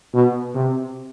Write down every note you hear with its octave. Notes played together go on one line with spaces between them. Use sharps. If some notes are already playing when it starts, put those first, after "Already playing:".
B2
C3